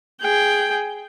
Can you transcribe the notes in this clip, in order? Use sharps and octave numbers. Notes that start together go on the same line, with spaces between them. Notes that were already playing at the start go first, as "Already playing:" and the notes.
G#4 G5